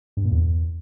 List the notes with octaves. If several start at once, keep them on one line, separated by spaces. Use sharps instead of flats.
G2
A#2
E2